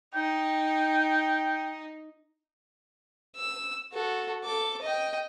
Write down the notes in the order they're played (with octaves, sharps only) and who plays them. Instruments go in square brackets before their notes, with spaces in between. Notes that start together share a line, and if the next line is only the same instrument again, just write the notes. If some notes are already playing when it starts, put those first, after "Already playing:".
[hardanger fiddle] D#4 [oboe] G5
[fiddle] E6
F#4 A4
A4 D6
D#5 G5